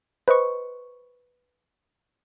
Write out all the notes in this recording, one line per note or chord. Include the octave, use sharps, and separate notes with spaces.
B4 C5 D#5 C#6